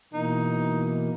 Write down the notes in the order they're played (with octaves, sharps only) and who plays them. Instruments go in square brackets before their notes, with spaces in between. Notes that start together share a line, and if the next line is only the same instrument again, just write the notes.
[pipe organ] B2 E3 A#3 [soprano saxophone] D#4